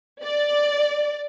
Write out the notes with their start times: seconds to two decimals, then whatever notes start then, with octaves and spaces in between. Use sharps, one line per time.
0.22 D5